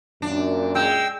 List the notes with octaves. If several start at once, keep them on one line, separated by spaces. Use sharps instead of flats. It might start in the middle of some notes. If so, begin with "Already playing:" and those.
F#2 A#2 D4
G#3 G5 E6